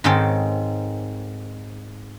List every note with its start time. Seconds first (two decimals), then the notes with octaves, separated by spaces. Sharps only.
0.04 G#2 D#3 C4 A4 C5 C#5